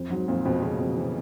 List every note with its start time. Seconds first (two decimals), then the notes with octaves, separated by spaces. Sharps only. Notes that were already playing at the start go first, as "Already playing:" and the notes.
Already playing: F2
0.10 G#2 F#3
0.28 F2 A#2
0.45 F2 B2
0.62 F2 C#3
0.80 F2
0.97 E3